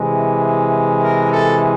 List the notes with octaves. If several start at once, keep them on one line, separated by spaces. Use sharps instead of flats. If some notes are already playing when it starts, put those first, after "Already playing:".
Already playing: C3 E3 G#3
A#4
A4